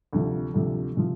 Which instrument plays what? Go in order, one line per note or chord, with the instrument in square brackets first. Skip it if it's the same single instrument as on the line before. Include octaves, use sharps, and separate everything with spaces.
[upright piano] D2 C3 F3
D2 C3 F3
C3 F3